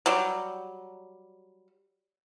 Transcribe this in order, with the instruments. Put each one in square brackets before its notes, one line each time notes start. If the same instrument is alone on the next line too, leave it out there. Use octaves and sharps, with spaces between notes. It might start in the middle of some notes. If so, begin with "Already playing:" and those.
[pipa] F#3 G3